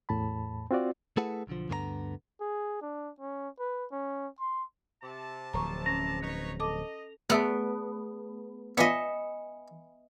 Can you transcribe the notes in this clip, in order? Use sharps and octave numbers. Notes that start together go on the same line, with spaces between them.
E2 A2 A5 B5
C4 F4 F#4 D5
A3 E4 G#4 A4 B4 F#5
B1 D3 F3
D2 G2 D3 B3 G#4 A#5
G#4
D4
C#4
B4
C#4
C6
C3 A5
D1 F3 A#5 C#6
C#4 A#5
D#4 B4 C#5
A4 D#5 A5 D6
A3 B3 G#4 A#4 E5 A5
B3 D4 F4 D#5 E5 G#5 B5 C#7